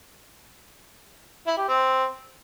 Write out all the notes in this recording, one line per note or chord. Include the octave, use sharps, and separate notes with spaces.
E4
G4
C4